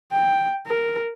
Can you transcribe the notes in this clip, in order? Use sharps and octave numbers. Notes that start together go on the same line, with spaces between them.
G5
A#4